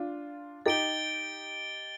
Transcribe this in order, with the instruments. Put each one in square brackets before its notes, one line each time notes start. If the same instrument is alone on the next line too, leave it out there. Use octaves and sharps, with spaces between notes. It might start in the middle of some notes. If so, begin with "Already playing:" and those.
Already playing: [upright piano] D4 F4
[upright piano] D#4 G4 [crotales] A6 D7 G7